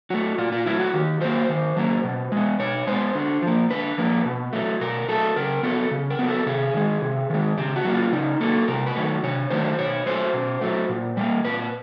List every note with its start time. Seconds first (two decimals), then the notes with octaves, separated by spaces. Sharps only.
0.10 F#3 A3 F#4
0.38 A#2 F4
0.52 F4
0.66 F#3 A3 E4
0.79 F#4
0.94 D#3 G4
1.21 F#3 A#3 C5
1.49 D#3
1.77 F#3 A#3
2.04 B2
2.32 G#3 B3
2.59 B2 C#5
2.87 G#3 B3 C5
3.15 D3
3.42 F3 A#3
3.70 D3 B4
3.98 F3 A#3
4.25 B2
4.53 F#3 A3
4.81 B2 A#4
5.09 F#3 A3 A4
5.36 C#3 A#4
5.63 F#3 B3 A4
5.91 C#3
6.10 A#4
6.19 F#3 B3
6.28 A4
6.46 C3 G#4
6.74 D#3 G#3
7.02 C3
7.30 D#3 G#3
7.58 C#3 G4
7.76 F#4
7.85 F#3 A#3
7.94 F4
8.12 C#3 D#4
8.40 F#3 A#3 A4
8.68 C3 A#4
8.86 B4
8.96 D#3 F#3 A3
9.23 C3 C#5
9.50 D#3 F#3 A3 C5
9.79 B2 C#5
10.06 F#3 A3 C5
10.34 B2
10.61 F#3 A3
10.89 A#2
11.17 G3 A#3
11.45 A#2 B4